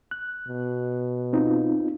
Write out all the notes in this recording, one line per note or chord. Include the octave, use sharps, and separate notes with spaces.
F#6
B2
C4 D#4 F4